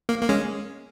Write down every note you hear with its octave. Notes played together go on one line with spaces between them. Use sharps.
A#3
A#3
G#3 C#4